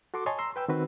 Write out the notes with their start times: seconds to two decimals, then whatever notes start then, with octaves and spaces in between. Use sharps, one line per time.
0.14 F#4 A4 C6 D6
0.26 C#5 D#5 G#5 A5 C6 C#6
0.39 A#5 C6 E6
0.56 B4 G5 E6
0.68 D#3 C4 F#4 B4